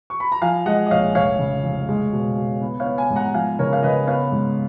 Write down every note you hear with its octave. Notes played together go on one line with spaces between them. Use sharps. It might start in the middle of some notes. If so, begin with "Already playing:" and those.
C#6
B5
A#5
F3 F5 G#5
G#3 D#5 F#5
D#5
A#1 C#5 F5
F1 C#5 F5
C#3
F1
G#3
B2
B2
B3
C#5 F5
B3
F5 G#5
G#2
F#5 A#5
F3 F5 G#5
C#3 A#4 C#5
F5
C#3 B4 D#5
B3 C#5 F5
G#2